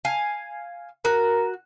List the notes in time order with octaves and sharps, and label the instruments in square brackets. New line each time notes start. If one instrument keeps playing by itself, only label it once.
[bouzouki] F5 G#5
[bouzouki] F#4 [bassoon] A#4